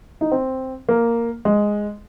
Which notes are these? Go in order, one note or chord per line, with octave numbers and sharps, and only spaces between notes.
D#4
C4
A#3
G#3